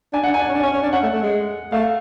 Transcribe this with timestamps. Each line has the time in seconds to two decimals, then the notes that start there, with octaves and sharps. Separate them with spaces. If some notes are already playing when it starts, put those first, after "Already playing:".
0.13 D4 G#5
0.24 D4 F#5
0.34 G#5
0.40 D4
0.49 C#4
0.54 D4
0.63 C#4
0.73 C#4
0.83 D4
0.93 C#4 F#5
1.03 A3
1.13 A3
1.23 G#3
1.72 A3 F5